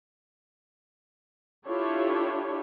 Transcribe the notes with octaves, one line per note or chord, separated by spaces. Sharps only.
D4 E4 F4 G4 A4 C#5